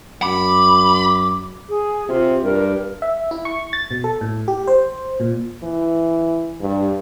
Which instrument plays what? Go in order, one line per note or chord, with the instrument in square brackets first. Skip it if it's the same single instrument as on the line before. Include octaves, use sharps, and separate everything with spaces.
[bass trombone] F#2 [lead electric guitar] B5 [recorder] D6
[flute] G#4
[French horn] C3 [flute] F4
[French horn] G2 [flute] A#4
[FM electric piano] E5
E4
C#6
A6
B2
A4
A2
G4
C5
A#2
[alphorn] E3
G2